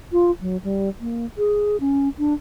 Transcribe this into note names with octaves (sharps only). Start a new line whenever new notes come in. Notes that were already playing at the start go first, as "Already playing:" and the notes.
F4
F#3
G3
A#3
G#4
C#4
D4